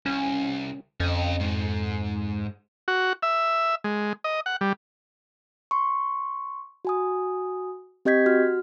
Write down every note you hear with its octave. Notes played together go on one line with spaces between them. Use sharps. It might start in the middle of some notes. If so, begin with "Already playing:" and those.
C2 C#4
F2 C#4 D#5
G#2
F#4
E5
G#3
D#5
F#5
G3
C6 C#6
F#4 G#5 D#6
C4 G4 D#5 G6 G#6 B6
F#4 F6